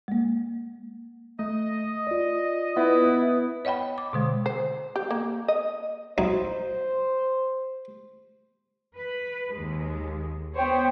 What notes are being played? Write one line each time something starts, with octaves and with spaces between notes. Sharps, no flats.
G#3 A#3
A3 D#5
F4 D5
B3 E4
C#5 D#5 F#5 G5 B5
D6
B2 D3 G#3
C5
G4
A#3
D#5
F#3 D#4 E4 C5
B4
D#2 G#3
B3 C5 C#5 G5